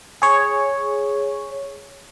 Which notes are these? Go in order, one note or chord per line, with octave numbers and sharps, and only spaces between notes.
G#4 C#5